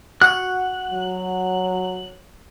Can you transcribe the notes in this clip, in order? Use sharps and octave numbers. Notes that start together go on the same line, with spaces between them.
F#4 F#5 F#6
F#3